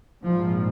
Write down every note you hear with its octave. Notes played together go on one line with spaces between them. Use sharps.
A#1 G#2 F3